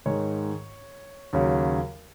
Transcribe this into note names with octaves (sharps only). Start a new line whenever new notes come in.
G#2 D#3 G#3 C#5
D#2 C#3 F#3